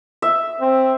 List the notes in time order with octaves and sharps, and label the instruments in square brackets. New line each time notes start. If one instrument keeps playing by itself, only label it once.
[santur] E5
[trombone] C4